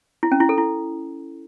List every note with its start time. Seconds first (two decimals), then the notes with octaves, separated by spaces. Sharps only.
0.23 E4
0.32 C#4
0.40 E4
0.49 A4
0.58 E4